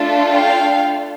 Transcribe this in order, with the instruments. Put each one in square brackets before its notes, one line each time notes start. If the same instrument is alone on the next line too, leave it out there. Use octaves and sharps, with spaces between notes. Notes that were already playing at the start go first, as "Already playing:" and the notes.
Already playing: [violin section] A3 D4 F4 A4
F5 G5